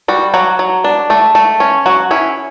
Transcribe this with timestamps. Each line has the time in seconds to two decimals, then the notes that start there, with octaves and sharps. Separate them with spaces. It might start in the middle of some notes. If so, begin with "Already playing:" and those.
0.08 G3 F#4
0.34 F#3 F#4
0.59 F#3
0.84 D4
1.10 A3
1.35 A3
1.60 C#4
1.86 F#3 F#4
2.11 C#4 E4